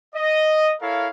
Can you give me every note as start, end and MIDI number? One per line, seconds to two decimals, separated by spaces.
0.15 0.74 75
0.81 1.08 64
0.81 1.08 69
0.81 1.08 70
0.81 1.08 73
0.81 1.08 77